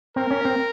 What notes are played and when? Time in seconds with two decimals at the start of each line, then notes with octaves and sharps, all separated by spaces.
0.16 C4 A#4
0.31 C#4
0.45 C4